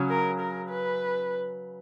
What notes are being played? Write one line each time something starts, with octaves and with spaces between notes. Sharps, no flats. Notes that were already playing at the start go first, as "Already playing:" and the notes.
Already playing: C#3 F#3 C#4
A#4
A#4
B4